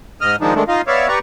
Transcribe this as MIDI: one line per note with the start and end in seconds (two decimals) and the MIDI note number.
0.21 0.36 44
0.21 0.36 75
0.21 0.36 89
0.41 0.54 51
0.41 0.54 53
0.41 0.54 56
0.41 0.54 62
0.41 0.54 63
0.55 0.64 51
0.55 0.64 56
0.55 0.64 57
0.55 0.64 62
0.68 0.82 63
0.68 0.82 65
0.68 0.82 75
0.68 0.82 77
0.87 1.08 59
0.87 1.08 73
0.87 1.08 74
0.87 1.08 76
0.87 1.08 77
1.08 1.19 67
1.08 1.19 71
1.08 1.19 74
1.08 1.19 82
1.08 1.19 85